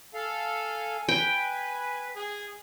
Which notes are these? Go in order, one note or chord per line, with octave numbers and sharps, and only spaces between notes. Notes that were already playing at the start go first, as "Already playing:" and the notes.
A4 F5 G#5
B4 G5
G#4